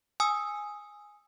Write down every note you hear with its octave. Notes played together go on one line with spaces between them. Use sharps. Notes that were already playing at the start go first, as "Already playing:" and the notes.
G#5 D#6 E6